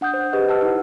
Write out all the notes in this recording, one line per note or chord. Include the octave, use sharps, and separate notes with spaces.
D4 F#5 D#6 G6
C5
G4 G#4 B4 D#5
F#5 A5 E6 F6
D#4 E4